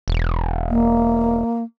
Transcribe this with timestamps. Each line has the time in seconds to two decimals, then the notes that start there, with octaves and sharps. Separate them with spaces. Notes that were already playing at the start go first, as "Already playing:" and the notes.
0.08 E1
0.69 A#3